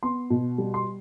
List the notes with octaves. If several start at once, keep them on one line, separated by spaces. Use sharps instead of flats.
B3 C6
B2
G3
C6